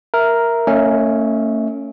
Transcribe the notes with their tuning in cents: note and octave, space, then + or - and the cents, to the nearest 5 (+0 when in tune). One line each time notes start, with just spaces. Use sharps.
A#4 +0 E5 +0
A3 +45 C#4 +0 E5 -40